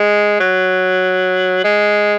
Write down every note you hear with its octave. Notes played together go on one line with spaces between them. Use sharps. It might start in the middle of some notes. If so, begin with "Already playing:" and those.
Already playing: G#3
F#3
G#3